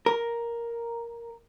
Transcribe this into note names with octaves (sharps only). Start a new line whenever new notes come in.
A#4